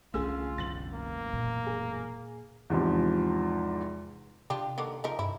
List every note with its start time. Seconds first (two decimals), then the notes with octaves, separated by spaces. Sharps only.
0.14 C2 D3 A3 C#4 F4 G#4 E6
0.58 E1 F#2 A2 A6 F#7
0.94 A#3
1.33 A#2
1.67 G#4
2.70 E2 G#2 C3 F3
4.50 C3 D4 F4 G4
4.78 D3 D#3 A#3
5.04 F3 D#4 A#4
5.19 G2 E4